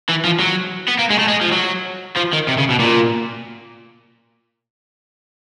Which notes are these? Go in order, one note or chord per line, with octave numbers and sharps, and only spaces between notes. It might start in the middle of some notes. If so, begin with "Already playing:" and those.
E3
F3
F#3
B3
A#3
G#3
A3
G#3
F3
F#3
F3
D#3
C3
C#3
B2
A#2